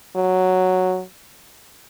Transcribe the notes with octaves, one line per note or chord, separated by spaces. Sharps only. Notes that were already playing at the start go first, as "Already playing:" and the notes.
F#3